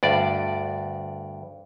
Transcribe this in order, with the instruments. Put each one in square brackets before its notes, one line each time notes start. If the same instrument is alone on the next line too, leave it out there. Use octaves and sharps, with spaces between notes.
[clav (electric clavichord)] D2 G2 D5